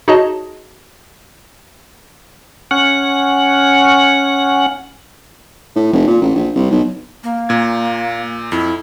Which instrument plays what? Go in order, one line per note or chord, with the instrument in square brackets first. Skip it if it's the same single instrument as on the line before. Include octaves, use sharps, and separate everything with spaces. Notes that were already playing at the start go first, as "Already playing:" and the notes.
[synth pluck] D#4 F#4 G#4 C#5 D#5 A5
[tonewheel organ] C#4 F#5
[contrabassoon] A2
F1
A#2
A1
A#1
C2
B1
[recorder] A#3
[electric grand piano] A#2 G#6
[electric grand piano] F2 [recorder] E4